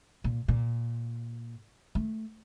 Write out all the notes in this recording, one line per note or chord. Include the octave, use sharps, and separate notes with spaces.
A#2
A#2
A3